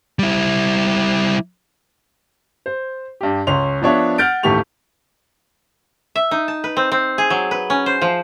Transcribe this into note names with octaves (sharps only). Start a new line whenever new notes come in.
G3 E4
C5
G2 G4
C#2 C#4 C6 F7
F3 B3 D4 C#5 E5
F#5 F6 G6 A6 D7
A1 D#2 A3 G4 C#6 F7
E5
D#4
A5
B4
C4
C4
G#4
F#3
B4
C#4
C5
F3